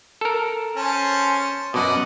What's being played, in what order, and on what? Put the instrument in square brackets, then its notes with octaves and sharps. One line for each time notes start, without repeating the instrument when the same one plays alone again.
[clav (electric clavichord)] A4 A#4
[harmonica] C#4 C5 A5
[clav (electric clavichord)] F#2 B2 [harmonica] D5 D#5 F#5